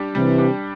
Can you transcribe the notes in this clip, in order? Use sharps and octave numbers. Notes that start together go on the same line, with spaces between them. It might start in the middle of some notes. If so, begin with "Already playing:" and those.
Already playing: G3 D4 G4
C3 E3 G3
D4 G4